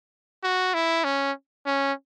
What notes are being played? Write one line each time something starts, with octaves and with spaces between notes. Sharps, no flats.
F#4
E4
C#4
C#4